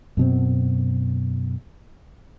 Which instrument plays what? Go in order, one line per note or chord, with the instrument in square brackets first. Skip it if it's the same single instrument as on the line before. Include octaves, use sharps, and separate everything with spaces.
[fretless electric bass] F#2 B2 C4